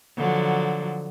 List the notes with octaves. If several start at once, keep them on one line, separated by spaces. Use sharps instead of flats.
D3 F3 F#3